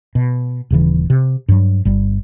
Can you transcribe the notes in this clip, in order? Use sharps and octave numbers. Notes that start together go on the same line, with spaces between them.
B2
D#1 C#3 E3
C3
G2 F#3
G1 G3